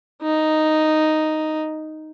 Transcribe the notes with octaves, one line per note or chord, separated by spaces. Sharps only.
D#4